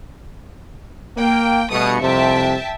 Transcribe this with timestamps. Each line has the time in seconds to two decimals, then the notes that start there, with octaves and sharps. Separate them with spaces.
1.17 A#3 G5
1.71 G2 B2 A3 D#6 C#7
2.02 C2 F2 C3 E5 G5 A5